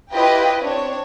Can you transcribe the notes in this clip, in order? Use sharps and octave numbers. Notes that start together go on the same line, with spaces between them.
E4 F4 G4 B4 D#5 G5
C4 D4 C#5